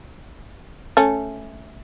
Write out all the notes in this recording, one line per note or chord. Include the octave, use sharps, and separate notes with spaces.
A3 C#4